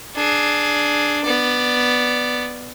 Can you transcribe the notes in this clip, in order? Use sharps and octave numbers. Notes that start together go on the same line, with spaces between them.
D4 G#4
B3 D5